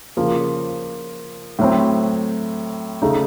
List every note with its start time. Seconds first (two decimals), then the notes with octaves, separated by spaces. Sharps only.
0.17 C#3 F3 A#3
1.59 A2 F#3 C4
3.02 C#3 A3 D#4